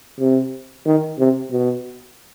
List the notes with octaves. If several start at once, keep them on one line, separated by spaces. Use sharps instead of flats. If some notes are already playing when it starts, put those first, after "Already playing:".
C3
D#3
C3
B2